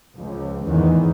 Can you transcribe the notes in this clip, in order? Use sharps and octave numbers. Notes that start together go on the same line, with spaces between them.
C#2 F3
F1 E2 G#2 D#3 E3